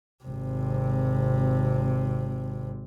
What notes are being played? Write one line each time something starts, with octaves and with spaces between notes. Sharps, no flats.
G#1 C3